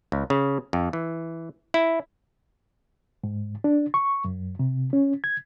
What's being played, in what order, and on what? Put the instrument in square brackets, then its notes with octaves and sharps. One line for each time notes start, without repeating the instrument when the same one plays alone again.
[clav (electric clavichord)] C#2
C#3
F2
E3
E4
[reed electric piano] G#2
D4
C#6
F#2
C3
C#4
G#6